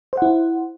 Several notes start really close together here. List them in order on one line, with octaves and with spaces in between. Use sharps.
C5 F#5 E4